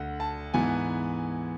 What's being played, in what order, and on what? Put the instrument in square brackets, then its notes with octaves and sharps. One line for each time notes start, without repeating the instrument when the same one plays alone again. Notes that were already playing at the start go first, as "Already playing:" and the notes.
Already playing: [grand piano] D2 D3 F#5
A5
G#2 E3 B3 G#5